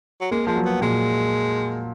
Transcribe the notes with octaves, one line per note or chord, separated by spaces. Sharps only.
F#3
G#3 A#3
F3 G#3
F#3
B3
A#2 G#3